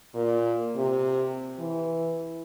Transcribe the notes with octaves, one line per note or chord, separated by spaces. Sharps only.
A#2
C3
E3